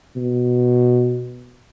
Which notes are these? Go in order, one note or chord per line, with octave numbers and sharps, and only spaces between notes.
B2